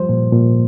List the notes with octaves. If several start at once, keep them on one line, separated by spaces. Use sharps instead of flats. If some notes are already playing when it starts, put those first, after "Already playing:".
Already playing: F3 G3 C5
A#2
A#2